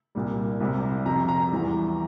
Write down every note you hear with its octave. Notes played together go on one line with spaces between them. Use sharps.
C2 A#2 G3
C2 C3 G3
F2 C3 F3 A#5
A#5
E2 E3 G3